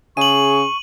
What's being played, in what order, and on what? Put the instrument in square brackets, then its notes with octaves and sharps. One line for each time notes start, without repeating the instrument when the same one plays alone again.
[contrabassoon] C#3 [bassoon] G#4 [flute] C#6 [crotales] D#7 F#7